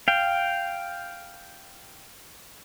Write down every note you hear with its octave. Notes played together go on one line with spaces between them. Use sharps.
F5 G5